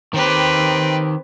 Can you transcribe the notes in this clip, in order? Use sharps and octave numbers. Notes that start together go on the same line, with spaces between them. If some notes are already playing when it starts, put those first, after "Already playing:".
D#3 C4 G4 B4